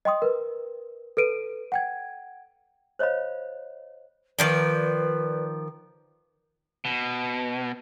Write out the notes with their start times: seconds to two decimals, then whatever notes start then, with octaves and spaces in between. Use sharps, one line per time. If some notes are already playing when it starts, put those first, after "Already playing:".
0.05 D#5 G5 C6 D#6
0.22 A#4 B4
1.17 A4 B4 D7 D#7
1.72 F#5 G5 G#6
2.99 C5 C#5 D#5 F5 B5
4.39 D#3 F3 B4 D5
6.85 B2